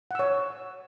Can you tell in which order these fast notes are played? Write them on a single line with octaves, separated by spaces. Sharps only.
F#5 E6 C#5